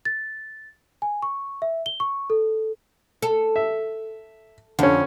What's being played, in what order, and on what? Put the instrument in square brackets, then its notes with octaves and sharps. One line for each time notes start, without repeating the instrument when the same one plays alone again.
[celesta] A6
G#5
C#6
E5
G7
C#6
A4
[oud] A4
[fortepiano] E5
[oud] F2 [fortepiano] D3 C#4